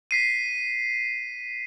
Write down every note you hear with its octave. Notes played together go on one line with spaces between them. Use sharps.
B6 C7 D#7